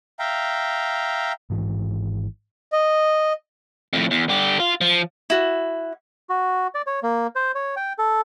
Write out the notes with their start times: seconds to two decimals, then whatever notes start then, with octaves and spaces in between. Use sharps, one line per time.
0.19 E5 F5 G5 A#5
1.50 G#1 G#2 E3 G#3
2.73 D#5
3.93 F2 A2
4.11 E2
4.29 D3 G4
4.60 F4
4.81 F3
5.30 E4 F#4
6.30 F#4
6.75 D5
6.86 C#5
7.03 A#3
7.36 C5
7.55 C#5
7.76 G5
7.99 A4